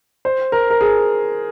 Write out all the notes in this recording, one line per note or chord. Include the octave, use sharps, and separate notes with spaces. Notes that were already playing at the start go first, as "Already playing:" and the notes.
C5
A#4
A#4
G#4